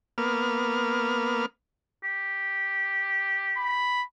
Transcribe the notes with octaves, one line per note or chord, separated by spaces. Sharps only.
A#3 B3 F6
G4
B5